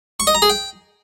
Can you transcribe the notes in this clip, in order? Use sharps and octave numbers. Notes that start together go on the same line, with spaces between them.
C#6
D#5
A#5
G#4
G5